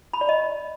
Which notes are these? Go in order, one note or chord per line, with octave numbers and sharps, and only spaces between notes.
B5
D5
D#5